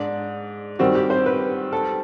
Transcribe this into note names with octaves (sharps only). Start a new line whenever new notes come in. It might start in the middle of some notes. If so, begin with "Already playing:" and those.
Already playing: G#2 D4
D#3 G3 C4 F#4
G4
C5
B4
A4